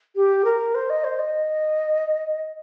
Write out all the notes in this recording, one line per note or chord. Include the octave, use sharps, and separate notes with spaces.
G4
A#4
C5
D#5
C5
D#5